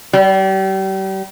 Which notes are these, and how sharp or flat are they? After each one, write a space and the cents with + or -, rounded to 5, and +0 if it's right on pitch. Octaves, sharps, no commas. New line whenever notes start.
G3 -35